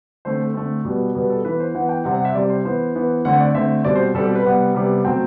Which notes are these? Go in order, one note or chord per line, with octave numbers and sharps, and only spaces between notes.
D3 A3 C4 C5
A4
D3 A3 C4
B2 G3 B3
B2 G3 B3 B4
A4
E3 B3 B4
C5
E3 B3 F#5
G5
C3 G3 C4 F#5
F#5
E5
C3 G3 C4 D5
C5
E3 B3 C5
E3 B3
D3 A3 C4 F#5
D5
D3 A3 C4 E5
B2 G3 C4 D5
C5
B2 G3 C4 A4
G4
B4
C3 G3 B3 F#5
C3 G3 B3
B2 F#3 A3 C4 G5